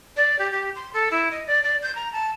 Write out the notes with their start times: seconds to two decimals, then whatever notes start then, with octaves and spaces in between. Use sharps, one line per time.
0.17 D5
0.39 G4
0.51 G4
0.76 C6
0.94 A4
1.11 E4
1.31 D#5
1.47 D5
1.63 D5
1.83 G6
1.95 A#5
2.13 A5